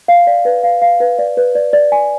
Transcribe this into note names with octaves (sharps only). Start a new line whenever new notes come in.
F5
D5
B4
F5
F5
B4
D5
B4
D5
D5
G#5